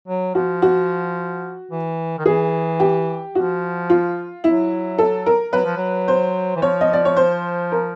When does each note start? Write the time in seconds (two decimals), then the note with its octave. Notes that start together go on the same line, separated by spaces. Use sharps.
0.08 F#3
0.35 F3 F#4
0.62 F#4
1.71 E3
2.18 D#3
2.25 E3 G#4
2.80 G4
3.35 F3 F#4
3.90 F4
4.44 F#3 E4
4.98 A4
5.26 A#4
5.52 F#3 B4
5.65 F3
5.77 F#3
6.08 C5
6.56 E3
6.62 F3 C#5
6.81 D#5
6.93 D5
7.05 C#5
7.17 C5
7.72 A#4